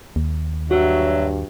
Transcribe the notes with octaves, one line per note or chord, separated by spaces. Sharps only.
D#2
G2 F#3 F#4 E5